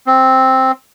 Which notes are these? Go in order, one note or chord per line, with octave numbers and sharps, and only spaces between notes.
C4